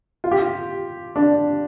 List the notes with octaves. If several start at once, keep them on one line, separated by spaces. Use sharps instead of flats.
F4
G4
F4
D4